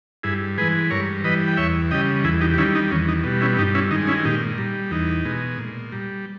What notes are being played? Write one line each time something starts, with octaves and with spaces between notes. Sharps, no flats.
G2 E4 G#4
E3 G#3 G#4 B4
G2 A#4 C#5
E3 G3 B4 D#5
G5
E2 C#5 E5
C#3 G3 D#5 G5
E2 E4 G#4
D#4 G4
G4
D#3 G3 C#4 E4
D#4
E2 C#4
D#4
B2 G3
C#4 E4
G2 D#4 G4
C#4 E4
D#3 G#3 D#4
C#4 E4
A#2 D#4 G4
G3
E2 D#4
B2 G#3
A#2
G3